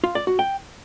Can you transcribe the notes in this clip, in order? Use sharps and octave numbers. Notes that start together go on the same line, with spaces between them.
F4
D5
F#4
G5